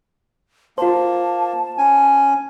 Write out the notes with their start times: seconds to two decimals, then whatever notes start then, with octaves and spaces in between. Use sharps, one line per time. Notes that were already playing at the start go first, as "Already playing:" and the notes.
0.78 A#3 F4 C5 A5
1.78 C#4 G#5